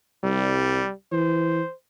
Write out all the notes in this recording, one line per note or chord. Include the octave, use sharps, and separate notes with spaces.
C2 G3
E3 C5